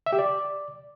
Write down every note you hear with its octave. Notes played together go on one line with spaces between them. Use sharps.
E5
G4
D5